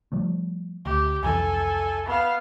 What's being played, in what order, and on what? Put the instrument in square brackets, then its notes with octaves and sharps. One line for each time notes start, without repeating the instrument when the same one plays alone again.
[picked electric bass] F3 G3 A3
[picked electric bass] D2 [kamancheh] G4
[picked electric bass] C2 F2 E3 [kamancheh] A4 G#5
[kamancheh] B3 F5